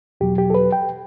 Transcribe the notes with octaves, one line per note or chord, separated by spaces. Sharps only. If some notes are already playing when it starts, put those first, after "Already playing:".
E2 B2 F#3 G4
G4
A4
B4
G5